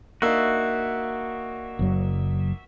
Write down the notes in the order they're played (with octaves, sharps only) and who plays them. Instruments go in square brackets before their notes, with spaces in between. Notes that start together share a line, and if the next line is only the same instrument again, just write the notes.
[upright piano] A#3 D4 D#4 [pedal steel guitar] F#4 E5
[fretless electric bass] F#1 F#3